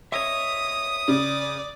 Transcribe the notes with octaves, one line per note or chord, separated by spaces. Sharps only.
C#5 D#5 E5 D#6
C#3 D5